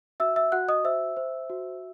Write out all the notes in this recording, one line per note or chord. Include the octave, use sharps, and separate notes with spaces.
F#4 E5 E6
E5 E6
F#4 F#5 F#6
D#5 D#6
C5 E5 E6
C5
F#4